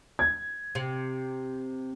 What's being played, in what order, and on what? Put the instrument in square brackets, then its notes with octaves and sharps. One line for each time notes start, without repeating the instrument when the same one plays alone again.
[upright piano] G#6
[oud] C3